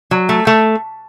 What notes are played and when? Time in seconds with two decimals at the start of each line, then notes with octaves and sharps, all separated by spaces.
0.11 F#3
0.29 A3
0.47 A3